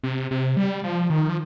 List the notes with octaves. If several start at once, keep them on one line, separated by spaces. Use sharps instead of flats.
C3
C3
G3
F3
D#3
F3